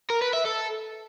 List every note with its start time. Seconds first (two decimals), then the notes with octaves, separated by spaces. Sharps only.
0.10 A#4
0.22 B4
0.34 E5
0.45 A4